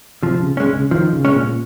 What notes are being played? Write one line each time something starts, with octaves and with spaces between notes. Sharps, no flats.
C3 F3
C#3
G#3 C#4
C#3
D#3 F3
C#3
G#3 C#4
A#2